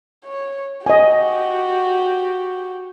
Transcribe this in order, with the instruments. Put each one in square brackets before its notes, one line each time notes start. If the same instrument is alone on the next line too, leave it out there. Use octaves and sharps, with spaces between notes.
[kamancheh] C#5
[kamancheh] F#4 G4 [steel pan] D#5 G#5